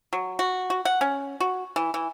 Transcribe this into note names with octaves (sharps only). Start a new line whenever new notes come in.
F#3
F#4
F#4
F#5
C#4
F#4
E3
E3